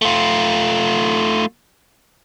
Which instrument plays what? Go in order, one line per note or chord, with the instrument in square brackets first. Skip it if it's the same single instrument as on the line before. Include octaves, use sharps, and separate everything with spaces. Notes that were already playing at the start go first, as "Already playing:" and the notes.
[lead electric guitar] A3 F4